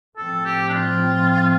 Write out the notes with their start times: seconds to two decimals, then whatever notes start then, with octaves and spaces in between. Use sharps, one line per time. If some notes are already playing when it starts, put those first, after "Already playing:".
0.17 A2 F3 C4 A4
0.45 G4
0.69 D4
0.73 F4